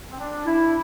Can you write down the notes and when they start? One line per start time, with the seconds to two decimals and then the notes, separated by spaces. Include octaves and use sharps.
0.09 C4
0.18 D4
0.45 E4